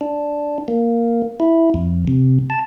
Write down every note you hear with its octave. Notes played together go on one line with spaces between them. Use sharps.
D4
A#3
E4
F2
C3
A5